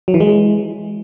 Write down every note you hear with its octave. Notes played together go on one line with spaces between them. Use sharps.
F#3
E3
G#3